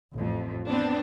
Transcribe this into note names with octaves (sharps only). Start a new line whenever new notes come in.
A1 F2
B3 C4 D4